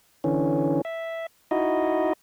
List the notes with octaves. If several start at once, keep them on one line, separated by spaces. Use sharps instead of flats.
D3 E3 C#4
E5
D#4 E4 F#4 D#5